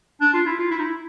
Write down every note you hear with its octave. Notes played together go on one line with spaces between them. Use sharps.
D4
F4
E4
F4
E4
D#4
E4